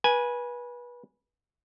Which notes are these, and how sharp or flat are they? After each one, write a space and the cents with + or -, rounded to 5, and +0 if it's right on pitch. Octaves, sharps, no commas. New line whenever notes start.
B4 -25 G#5 +0